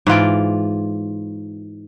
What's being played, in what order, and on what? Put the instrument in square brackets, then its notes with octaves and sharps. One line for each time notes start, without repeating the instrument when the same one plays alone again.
[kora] G#2 E3 F4 D5